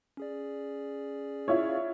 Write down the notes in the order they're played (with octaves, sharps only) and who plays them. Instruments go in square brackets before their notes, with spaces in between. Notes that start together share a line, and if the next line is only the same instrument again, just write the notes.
[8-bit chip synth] C#4 G#4 D5
[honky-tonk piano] E4 F4 C#5